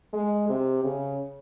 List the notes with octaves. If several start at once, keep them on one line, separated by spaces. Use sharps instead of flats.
G#3
C3
C#3